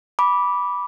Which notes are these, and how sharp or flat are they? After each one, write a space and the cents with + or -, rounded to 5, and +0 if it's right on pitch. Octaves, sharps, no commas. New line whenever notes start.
B5 -10 D6 -10